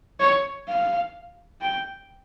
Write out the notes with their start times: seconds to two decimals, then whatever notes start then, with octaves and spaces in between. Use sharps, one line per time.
0.20 C#5
0.68 F5
1.61 G5